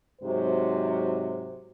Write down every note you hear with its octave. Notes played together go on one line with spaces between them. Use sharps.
G#2 C3 F#3 C5